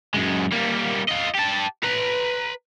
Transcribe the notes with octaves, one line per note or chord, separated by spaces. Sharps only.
F#2 G#3
G3 A#3
F4 D#5
G4 A5
B4 A#5